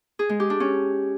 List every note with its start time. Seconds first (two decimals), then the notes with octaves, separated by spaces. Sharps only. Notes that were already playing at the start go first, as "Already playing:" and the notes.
0.19 G#4
0.29 G#3
0.40 G4
0.50 D4
0.60 C#4